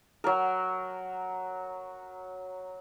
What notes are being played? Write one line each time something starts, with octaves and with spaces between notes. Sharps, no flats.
F#3 A#4